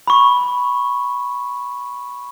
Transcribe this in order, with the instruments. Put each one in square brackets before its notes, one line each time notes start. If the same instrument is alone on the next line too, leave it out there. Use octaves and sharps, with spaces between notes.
[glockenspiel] B5 C#6